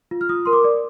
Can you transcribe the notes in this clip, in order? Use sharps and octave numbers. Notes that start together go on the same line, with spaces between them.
F4
F6
F4 D#6
A#4 C6
D6
D5